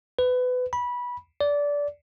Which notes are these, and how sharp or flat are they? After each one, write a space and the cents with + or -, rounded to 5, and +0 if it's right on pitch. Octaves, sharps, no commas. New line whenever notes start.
B4 +25
B5 -20
D5 -20